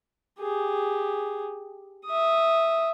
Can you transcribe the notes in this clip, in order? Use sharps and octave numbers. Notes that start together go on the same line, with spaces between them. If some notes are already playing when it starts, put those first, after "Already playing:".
G4 G#4
E5 D#6